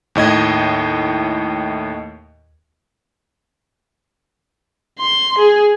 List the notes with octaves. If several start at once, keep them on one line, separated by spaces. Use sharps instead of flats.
D#2 A2 D#5 G#6
C6
G#4